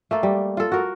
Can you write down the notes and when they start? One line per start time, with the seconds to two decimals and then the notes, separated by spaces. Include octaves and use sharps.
0.11 A3 A#3 A4
0.23 G3
0.57 F4 A4
0.72 F#4 A#4